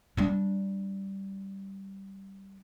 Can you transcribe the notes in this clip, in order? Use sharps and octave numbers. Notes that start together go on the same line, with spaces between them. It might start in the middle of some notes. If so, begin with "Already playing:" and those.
G3 D4